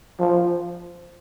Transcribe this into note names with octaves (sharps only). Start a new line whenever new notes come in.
F3